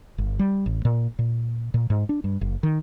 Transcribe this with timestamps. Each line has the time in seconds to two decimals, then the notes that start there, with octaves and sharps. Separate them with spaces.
0.18 G1
0.39 G3
0.66 A1
0.85 A#2
1.19 A#2
1.74 A#2
1.90 G#2
2.09 D4
2.24 G2
2.41 F#1
2.63 D#3